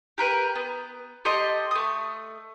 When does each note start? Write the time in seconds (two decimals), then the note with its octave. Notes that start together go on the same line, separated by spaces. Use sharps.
0.18 G4 A#4 B4
0.55 B3
1.25 G4 A4 D#5 C6
1.71 A3 D#6